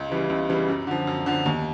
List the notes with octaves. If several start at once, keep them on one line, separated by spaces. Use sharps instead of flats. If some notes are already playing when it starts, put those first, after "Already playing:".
Already playing: C#2
C#3 E3 G3
C#2
C#3 E3 G3
F#2
D3 F3
F#2
D3 F3
D#2